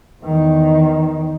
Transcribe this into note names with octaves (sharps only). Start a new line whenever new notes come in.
E2 D#3